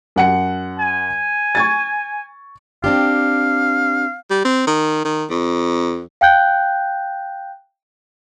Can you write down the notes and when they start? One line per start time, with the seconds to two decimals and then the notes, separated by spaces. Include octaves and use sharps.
0.16 F#2 F#5 C#7
0.79 G#5
1.55 C#6 G#6 A6
2.84 C4 D4 G4 F5
4.30 G3
4.45 C4
4.67 D#3
5.05 D#3
5.30 F2
6.21 F5 G5 F#6 G6